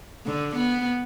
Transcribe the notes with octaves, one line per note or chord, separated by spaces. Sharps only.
D3
B3